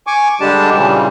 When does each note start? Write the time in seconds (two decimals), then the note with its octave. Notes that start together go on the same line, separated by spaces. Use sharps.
0.07 G#5 C#6 D6
0.41 D3 G3 G#3 D4 G4 A5
0.73 A#2 C#3 E3 G3